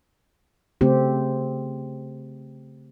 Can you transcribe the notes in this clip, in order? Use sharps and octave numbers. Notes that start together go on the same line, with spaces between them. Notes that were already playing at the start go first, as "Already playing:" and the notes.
C#3 A3 C4 G4